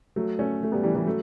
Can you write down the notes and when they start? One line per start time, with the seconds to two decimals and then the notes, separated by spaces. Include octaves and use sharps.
0.16 F#3 A3
0.39 A3 C#4
0.63 A3
0.72 G3 B3
0.83 E3 G3
0.95 E3 G3
1.06 F#3 A3